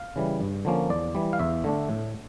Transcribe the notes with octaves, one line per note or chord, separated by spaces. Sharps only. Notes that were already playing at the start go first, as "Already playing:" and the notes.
Already playing: F5
C#3 E3 G3
G2
D3 F3 A#3 C#4
E2 D5
E3 G3
F5
E2 E5
D3 A3 D4
A2